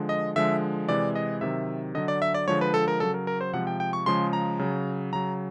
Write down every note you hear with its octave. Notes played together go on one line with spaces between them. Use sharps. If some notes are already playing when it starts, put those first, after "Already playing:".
Already playing: D3 F3 G#3
D#5
D3 F3 G#3 E5
C3 E3 G#3 D5
D#5
C3 D#3 F#3 E5
D3 F#3 D#5
D5
E5
D5
D3 F3 G#3 C#5
B4
A4
A#4
C#3 F#3 A4
A#4
A#4
C5
C3 F3 G#3 F#5
G5
G5
C#6
C#3 F3 G#3 C6
A#5
C#3 F#3
C#3 F#3 A#5